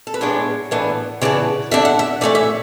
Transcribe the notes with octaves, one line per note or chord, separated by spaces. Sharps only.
A4
B4
A2 G#3 B3 D4 C#5
A2 E3 B3 D4
C#3 E3 B3 D4 D5
D3 A3 D4 E5
F#5
E5
E3 A3 C#4 D5
E5